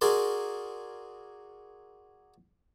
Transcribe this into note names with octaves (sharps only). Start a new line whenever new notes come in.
F#4 G#4 A#4 D5 C6